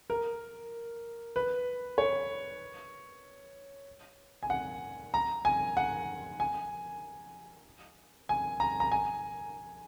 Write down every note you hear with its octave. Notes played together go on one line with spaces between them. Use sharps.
A#4
B4
C#5
G#5
F#5
A#5
G#5
F#5
G#5
G#5
A#5
A#5
G#5